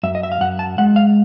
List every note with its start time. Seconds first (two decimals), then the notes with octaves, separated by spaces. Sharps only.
0.03 F#2 E5
0.15 D#5
0.23 E5
0.32 F5
0.41 F#2 F#5
0.59 A5
0.78 G#3 F#5
0.96 F5